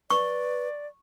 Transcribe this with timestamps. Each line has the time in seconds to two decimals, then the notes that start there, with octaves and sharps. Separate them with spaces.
0.10 B4 D5 C#6